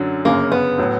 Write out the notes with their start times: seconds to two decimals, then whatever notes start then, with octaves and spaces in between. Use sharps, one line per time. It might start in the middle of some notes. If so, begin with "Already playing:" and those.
Already playing: F#2 D3 F#3
0.25 G1 F#2 C#3 A#3
0.52 B3
0.78 A2 F#3